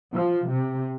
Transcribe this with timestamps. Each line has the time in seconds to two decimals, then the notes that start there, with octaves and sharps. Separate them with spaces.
0.14 F3
0.49 C3